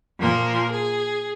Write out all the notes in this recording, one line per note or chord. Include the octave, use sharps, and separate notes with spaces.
A#2 F3 A#3 A#4
G#4